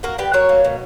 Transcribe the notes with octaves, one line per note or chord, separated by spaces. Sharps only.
A#3 F#4 A#4
D3 G4 B4
F#3 A#4 C#5
A#3
B2